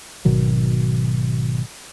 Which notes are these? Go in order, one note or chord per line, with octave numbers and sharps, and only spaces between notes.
G#1 B2 D#3 F#3